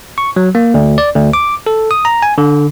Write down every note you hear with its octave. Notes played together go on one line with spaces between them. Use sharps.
C#6
F#3
A#3
D2
D5
D2
D6
A4
D#6
A#5
G#5
D3